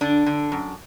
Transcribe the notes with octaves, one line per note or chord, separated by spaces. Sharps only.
D3 D4
D3
F#2